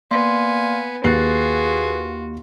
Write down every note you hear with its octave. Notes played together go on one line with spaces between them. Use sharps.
A#3 B3 D5 F5 G#5 C6
D#2 F4 F#4 G#4 B4 F#6 A6 C7